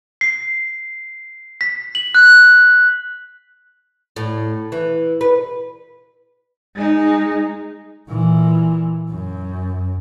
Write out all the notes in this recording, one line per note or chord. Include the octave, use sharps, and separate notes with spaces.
C7
B6
F#7
F#6
A2
E3
B4
G#3 D#4
A#2 E3
F#2